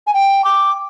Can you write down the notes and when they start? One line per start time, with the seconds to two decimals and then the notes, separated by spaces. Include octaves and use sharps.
0.07 G#5
0.14 G5
0.44 D6